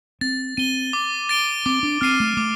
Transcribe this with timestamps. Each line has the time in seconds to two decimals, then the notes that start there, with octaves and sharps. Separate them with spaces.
0.21 C4 A6
0.57 C4 D#7 G7
0.93 D6
1.29 A6 D7 G7
1.66 C4 D6
1.83 D4
2.01 C4 F6 C7 D#7
2.20 A3
2.37 A3 D6